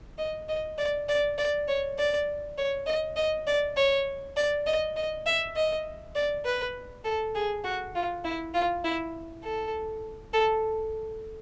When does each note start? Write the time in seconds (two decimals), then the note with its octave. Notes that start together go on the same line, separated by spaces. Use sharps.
0.18 D#5
0.49 D#5
0.78 D5
1.09 D5
1.38 D5
1.68 C#5
1.98 D5
2.58 C#5
2.86 D#5
3.16 D#5
3.47 D5
3.76 C#5
4.36 D5
4.66 D#5
4.96 D#5
5.26 E5
5.56 D#5
6.15 D5
6.45 B4
7.04 A4
7.35 G#4
7.64 F#4
7.95 F4
8.24 E4
8.54 F4
8.84 E4
9.43 A4
10.33 A4